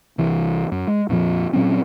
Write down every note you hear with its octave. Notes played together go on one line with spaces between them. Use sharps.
C2 E3
F#2
G#3
F2 A#2 F3
A#2 F#3 C4 C#4